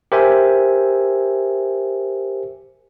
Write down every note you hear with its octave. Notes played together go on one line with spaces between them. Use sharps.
G4 A#4 C5 E5 G#5